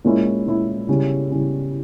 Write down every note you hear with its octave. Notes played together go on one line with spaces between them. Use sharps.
A#2 G#3 C#4 E4
A#2 G#3 C#4 E4
C#3 G3 C#4 E4
C#3 G3 C#4 E4